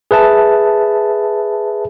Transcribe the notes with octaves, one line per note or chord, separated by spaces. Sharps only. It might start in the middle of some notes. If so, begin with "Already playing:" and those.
G#4 B4 E5 A5